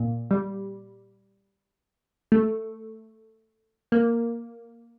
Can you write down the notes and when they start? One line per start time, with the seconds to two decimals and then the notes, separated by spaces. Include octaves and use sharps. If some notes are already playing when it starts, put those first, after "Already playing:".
Already playing: A#2
0.31 G3
2.32 A3
3.92 A#3